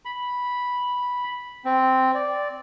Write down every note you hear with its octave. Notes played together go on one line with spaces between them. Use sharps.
B5
C4
D5